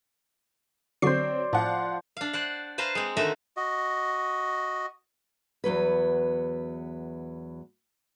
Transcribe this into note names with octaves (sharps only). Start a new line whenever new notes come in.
D3 F#3 C4 C5 D5 C#6 C7
A2 F3 D5 F5 F#5
D4 F5
C5 D5 F#5
B4 C5 F5 A5 A#5
G#3 C4
D3 D#3 A3 F#4 E5 A#5
F#4 D#5
E2 G#2 F#3 B4